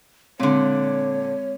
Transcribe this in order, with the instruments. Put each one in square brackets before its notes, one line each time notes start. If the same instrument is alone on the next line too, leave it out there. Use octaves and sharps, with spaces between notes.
[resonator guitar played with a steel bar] A#2 D3 [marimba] G#3 C4 [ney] C#5